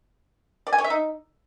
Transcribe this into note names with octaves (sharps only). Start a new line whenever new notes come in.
D5
G#5
C#5
E5
D#4